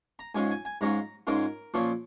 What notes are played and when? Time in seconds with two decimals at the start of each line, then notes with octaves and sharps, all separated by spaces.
0.19 A#5
0.35 G#2 G#3 C#4 F4 G#5
0.50 G#5
0.65 G#5
0.81 G#2 G#3 C#4 F4 A#5
1.27 G#2 G#3 C#4 F4 A#4
1.74 A#2 F3 C#4 F4